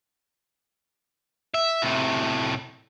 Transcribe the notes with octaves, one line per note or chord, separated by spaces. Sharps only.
E5
A2 C3